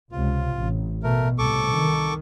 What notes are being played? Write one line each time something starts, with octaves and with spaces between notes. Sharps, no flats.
C#2 C3 F4
A1
B2 A3 A#4
C2 A2 A4 C#6 D6
D#3